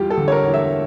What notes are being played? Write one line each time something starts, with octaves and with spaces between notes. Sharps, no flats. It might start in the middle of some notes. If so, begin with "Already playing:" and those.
Already playing: E2 G3 F4 G4
A4
D3
C#5
A#4
E2
E5